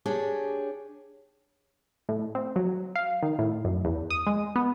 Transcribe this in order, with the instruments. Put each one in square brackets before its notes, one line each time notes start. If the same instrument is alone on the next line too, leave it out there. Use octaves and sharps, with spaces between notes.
[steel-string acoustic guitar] D4 G4 G#4 C#5
[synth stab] A2
C4
F#3
F5
D#3
A2
F#2
E2
D#6
G#3
B3